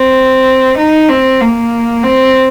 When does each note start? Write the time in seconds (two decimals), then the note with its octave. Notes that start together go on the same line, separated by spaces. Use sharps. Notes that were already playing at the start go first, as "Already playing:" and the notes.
Already playing: C4
0.77 D#4
1.09 C4
1.40 A#3
2.03 C4